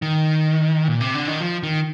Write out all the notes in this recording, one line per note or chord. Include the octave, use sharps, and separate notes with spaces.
D#3
A#2
C3
D3
D#3
F3
D#3